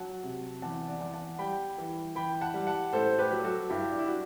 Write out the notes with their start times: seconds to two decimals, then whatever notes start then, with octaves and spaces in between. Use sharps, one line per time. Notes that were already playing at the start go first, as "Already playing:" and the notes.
Already playing: F#3 F#5 A5
0.24 C3
0.62 E2 F#5 A5
0.88 D5 F#5
1.01 E2
1.14 F#5 A5
1.39 G3 G5 B5
1.78 E3
2.15 E3 G5 B5
2.41 F#5 A5
2.54 G3
2.67 F#5 A5
2.93 A2 A4 C5
3.18 G4 B4
3.31 F#3
3.44 F#4 A4
3.69 G2 E4 G4
3.91 D4
3.99 E4
4.08 D4 F#4